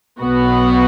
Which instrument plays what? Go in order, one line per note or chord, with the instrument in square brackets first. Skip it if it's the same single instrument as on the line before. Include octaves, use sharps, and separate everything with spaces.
[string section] B1 B2 B3 F#4